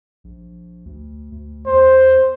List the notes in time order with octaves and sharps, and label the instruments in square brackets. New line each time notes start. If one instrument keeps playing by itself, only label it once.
[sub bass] A#1
D2
D2
[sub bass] E2 [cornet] C5